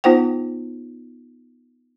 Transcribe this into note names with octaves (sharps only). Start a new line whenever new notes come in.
B3 D#4 F4 C5 F#5 G5